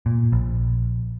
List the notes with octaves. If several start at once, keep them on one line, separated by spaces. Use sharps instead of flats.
A#2
A#1